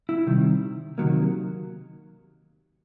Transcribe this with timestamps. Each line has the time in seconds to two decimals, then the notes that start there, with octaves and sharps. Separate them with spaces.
0.09 E4
0.27 C3 D#3 G3
0.98 C3 D#3 F#3 A#3